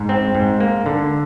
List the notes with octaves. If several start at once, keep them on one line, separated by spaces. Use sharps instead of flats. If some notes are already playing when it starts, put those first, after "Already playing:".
Already playing: G#2
C4
G#2
A#3
D3